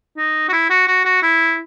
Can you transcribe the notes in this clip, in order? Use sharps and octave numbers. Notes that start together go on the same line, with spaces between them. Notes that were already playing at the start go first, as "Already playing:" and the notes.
D#4
F#4
E4
F#4
F#4
F#4
E4